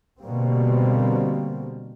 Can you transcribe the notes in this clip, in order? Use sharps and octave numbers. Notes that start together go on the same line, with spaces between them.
B2 D3 G3 A#3 C4